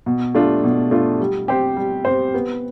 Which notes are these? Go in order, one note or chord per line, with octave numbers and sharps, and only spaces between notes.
B2
A3 D4 F4
B2
A3 D4 F4
G3
C4 G4 C5
G3
C4 G4 C5
B3